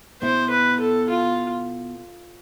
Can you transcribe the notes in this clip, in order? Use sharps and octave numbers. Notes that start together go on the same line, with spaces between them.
B2 B3 E4 C5
B4
A4
F4